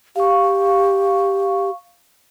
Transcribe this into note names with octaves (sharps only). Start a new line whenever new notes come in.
G4 F5 C#6